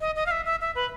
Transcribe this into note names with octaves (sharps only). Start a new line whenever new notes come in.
D#5
D#5
F5
E5
E5
E5
B4